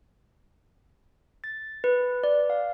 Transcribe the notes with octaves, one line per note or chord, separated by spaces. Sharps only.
A6
B4
D5
F5